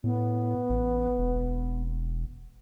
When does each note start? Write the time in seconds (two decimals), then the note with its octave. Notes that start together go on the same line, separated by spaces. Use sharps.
0.04 A2 B3
0.70 A1
1.18 E1